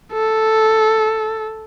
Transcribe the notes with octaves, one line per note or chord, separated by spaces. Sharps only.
A4